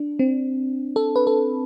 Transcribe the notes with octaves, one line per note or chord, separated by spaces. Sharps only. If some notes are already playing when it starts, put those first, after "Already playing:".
Already playing: D4
C4
A4
B4
A4